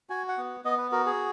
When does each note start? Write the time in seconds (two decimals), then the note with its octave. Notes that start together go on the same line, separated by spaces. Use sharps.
0.10 F#4 G#5
0.28 F#5
0.38 B3
0.65 B3 D#5
0.78 B4
0.92 F#4 A#4
1.06 G#4